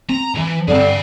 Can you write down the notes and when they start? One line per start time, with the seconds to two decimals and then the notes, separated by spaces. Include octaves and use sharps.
0.10 C4 A#5
0.35 C#2 E3
0.68 G2 D3 C4 G#4 F5